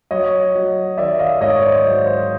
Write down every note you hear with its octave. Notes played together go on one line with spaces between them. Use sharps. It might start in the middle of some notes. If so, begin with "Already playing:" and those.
F#3 C#5 D#5
F#3
D#3 D5 E5
D#5 F5
G#2 C#5 D#5
C5 D5
F#3 C5
C5